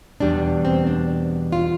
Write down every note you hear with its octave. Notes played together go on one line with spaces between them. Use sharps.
E2 B2 G3 D4
C4
D4
F4